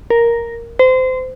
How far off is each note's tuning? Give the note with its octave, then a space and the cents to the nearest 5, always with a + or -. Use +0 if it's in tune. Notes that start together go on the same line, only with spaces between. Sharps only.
A#4 +0
C5 -25